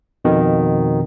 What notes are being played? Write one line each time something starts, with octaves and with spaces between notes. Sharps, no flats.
F2 B2 D#3